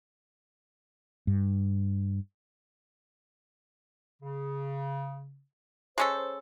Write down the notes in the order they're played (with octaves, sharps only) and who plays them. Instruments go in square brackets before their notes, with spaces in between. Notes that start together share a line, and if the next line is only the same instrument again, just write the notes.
[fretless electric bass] G2
[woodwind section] C#3
[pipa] G#3 C#4 A4 [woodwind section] C5